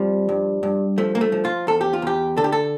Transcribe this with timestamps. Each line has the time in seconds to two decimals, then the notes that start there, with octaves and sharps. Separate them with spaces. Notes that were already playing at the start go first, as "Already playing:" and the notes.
Already playing: F2 F3 G3
0.29 G2
0.63 G2
0.98 F3 A3
1.15 A#3
1.21 A3
1.32 F3
1.45 F4
1.67 E2 A4
1.81 G4
1.93 F4
2.02 E2 G4
2.37 D3 A4
2.44 G4
2.52 A4